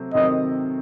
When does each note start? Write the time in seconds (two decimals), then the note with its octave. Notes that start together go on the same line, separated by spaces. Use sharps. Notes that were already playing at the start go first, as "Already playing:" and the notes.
Already playing: C3 F#3 A3 C4
0.14 C3 D#3 F#3 A3 C4 D#5